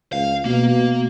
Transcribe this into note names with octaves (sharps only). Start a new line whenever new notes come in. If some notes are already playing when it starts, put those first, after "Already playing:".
C#2 F5
B2 A#3